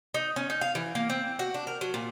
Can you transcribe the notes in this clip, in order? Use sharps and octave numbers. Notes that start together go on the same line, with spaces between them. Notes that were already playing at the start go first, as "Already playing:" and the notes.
D#4
C#4
D#4
F5
E3
A#3
C4
F#4
D4
A#4
F#3
A#2